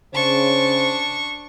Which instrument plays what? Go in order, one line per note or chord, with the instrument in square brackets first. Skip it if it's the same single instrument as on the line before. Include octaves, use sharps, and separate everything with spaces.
[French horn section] C#3 C5 [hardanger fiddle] D4 C#6